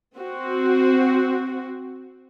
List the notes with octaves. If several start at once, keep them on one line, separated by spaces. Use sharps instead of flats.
C4 F#4